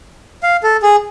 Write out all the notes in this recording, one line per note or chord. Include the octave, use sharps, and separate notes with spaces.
F5
A4
G#4